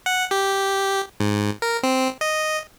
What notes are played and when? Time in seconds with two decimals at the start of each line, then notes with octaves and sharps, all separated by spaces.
0.06 F#5
0.31 G4
1.20 G#2
1.62 A#4
1.83 C4
2.21 D#5